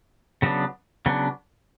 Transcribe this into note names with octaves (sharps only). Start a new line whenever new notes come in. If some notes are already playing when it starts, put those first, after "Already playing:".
C#3 F#3 B3 D4
C#3 F#3 B3 D4